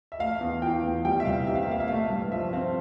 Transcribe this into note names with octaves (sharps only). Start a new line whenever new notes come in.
E5
A3 F5
E2
E3 G5
E2
G3 G5
E5
C2 F5
C3 E5
F5
E5
A#3 F5
E5
A3 F5
E5
G2
F3 E5
C4 F5